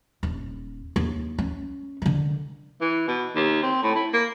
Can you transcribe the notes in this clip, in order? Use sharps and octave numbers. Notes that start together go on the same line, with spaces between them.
D#1
D#2
C#4
D3 D#3
E3
B2
D#2
C4
A2
E4
A#3